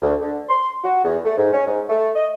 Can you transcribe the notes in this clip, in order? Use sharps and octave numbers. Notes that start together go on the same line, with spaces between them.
D2
D3
C6
F#4
E2
A3
G#2
C#4
G#2
A3
D#5